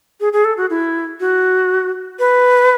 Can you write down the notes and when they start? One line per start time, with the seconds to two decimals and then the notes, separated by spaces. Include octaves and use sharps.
0.20 G#4
0.33 G#4
0.45 A4
0.57 F#4
0.70 E4
1.20 F#4
2.19 B4